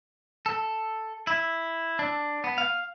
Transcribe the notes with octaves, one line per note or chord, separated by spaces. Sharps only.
A4
E4
D4
B3
F5